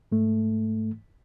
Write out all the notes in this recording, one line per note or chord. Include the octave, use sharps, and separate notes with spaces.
G#2 A3